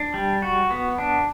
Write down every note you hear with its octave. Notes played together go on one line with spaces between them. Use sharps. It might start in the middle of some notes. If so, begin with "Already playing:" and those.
Already playing: D4
G3
F#4
B3
D4